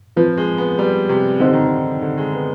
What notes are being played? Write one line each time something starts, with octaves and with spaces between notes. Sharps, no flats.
F3 C4 F4 B4
G#3
B3
G3
C3
D3 C4 D#4 G4 C5 D#5
D#3
D3
D3
G#3
B3